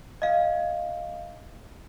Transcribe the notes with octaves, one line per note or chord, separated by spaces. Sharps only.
D#5 F5